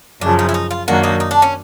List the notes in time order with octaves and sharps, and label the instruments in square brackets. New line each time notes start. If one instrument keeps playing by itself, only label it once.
[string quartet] F#2 C#3 F3 [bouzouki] D4
[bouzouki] D#4
E4
D#4
F4
[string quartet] F#2 D#3 F#3 A#3 D4 [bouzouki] F#4
[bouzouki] D#4
D#4
D4
C#4